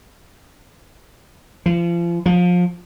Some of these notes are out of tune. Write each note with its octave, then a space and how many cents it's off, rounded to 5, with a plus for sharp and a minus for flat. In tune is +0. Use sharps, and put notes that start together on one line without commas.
F3 -35
F3 +25